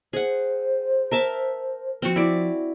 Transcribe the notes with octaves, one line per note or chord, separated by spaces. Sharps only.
G#4 C5 F#5
A#4 E5 A5
F3 C4 F#4
E4 D5